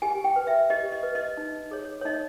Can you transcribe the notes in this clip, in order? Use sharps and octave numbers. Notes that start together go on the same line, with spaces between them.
G4 G#5
G5
B4
E5
G4 D#5
D#5
B4
D#5
D#4
G#4 C#5
C#5
D#4 D#5